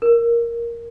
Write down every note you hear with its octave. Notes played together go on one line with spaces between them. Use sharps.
A#4